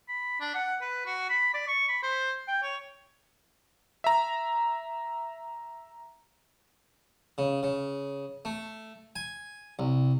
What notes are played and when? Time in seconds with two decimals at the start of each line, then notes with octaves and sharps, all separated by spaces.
0.09 B5
0.40 D4
0.55 F#5
0.81 B4
1.06 F#4
1.30 B5
1.54 D5
1.68 C#6
1.89 B5
2.03 C5
2.47 G5
2.63 C#5
4.04 E5 A#5
7.38 C#3
7.63 C#3
8.45 A3
9.16 G#5
9.79 C2